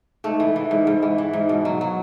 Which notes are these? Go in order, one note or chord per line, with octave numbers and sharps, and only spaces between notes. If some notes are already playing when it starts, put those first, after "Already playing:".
G#2 A3
E3
E3
G#2
G#2
E3
E3
G#2
B2
F#3
F#3